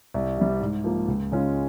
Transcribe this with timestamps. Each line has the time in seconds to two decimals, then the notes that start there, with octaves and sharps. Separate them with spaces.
0.14 C2
0.38 C3 G3
0.61 G#2
0.84 F3 A#3
1.08 C#2
1.32 C#3 G#3 C#4 F4